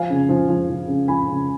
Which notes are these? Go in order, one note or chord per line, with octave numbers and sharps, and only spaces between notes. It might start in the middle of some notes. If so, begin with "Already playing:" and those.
Already playing: F3 F5 G#5
C#3
F3
F3
F3
C#3
F3 G#5 B5
C#3